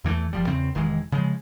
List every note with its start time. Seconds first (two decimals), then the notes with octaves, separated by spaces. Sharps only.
0.04 E2 E3 G3 A3
0.33 F#1 F3 G3
0.47 E2 C#3 C4
0.75 F1 D#3 E3 G#3
1.12 C#3 F3 G#3